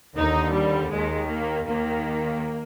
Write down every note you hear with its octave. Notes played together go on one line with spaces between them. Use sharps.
D#2 D3 D#4
G3
D#2 D#3 G#3
A#3
D#2 D#3 A#3